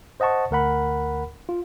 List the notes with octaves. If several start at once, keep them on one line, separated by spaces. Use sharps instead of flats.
C5 D#5 F#5 A5 C#6
D2 A#4 F#5 B5
F4